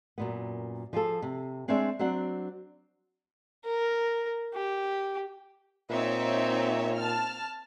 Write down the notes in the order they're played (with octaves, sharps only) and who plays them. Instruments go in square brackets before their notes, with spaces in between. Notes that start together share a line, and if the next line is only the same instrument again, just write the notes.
[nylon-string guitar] F#2 A#2 B3
F3 F4 G#4 A4
C3
G#3 C4 D4 G#4 C#5 E5
F#3 C4 D4 F#5
[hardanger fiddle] A#4
G4
[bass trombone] A#2 [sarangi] C4 [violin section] D#4 C#5 E5
[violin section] A5 F6